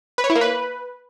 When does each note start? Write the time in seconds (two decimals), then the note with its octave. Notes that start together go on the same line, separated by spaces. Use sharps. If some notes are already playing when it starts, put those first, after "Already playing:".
0.18 B4
0.24 C#5
0.30 E4
0.35 A#3
0.41 B4